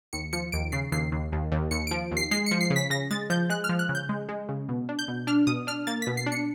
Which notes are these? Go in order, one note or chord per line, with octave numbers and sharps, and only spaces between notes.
D#2 C#7
F3 C#7
D#2 D7
C#3 C7
D#2 C7
D#2
D#2
D#2
D#2 C#7
F3 D7
D#2
C7
G#3 C7
F3 C#7
C7
C#3
B6
C#3 A#6
G#3 A6
F3 G6
G#3 F#6
F6
F3
F#6
C#3
G6
G#3
G#3
C#3
B2
D4
G6
B2
D4 F6
B2 D#6
D4 F6
A#3 A6
B2 B6
C7
D4
C#7